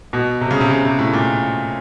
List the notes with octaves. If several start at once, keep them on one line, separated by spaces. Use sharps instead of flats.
B2
C3
C#3
C3
C#3
C3
A2
A#2